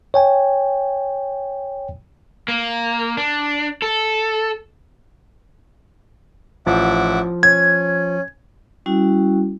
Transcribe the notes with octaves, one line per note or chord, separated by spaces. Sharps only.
C#5 G5 G#5
A#3
D4
A4
A1 F3 E5 F#5 D6
C#4 G#6
G3 C#4 E4 F#4